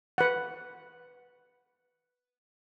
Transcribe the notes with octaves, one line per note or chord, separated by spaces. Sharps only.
B4 F#5